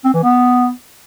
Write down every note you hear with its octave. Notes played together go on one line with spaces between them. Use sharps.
C4
E3
B3